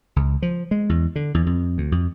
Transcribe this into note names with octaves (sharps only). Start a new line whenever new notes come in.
C#2
F3
G#3
E2
D3
E2
F2
D2
F2